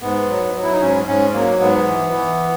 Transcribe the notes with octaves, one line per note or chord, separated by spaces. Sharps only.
G#2 B3
F#3
F#3
E4
D#4
G#2 C#4
G#2 C#4
F#3 A#3
G#2 B3
E3
E3